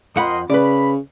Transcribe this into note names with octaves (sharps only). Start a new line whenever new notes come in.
F2 A#4 D#5 F#5 B5 C6
C#3 B4 D5 B5